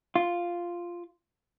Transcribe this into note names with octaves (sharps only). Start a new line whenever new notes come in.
F4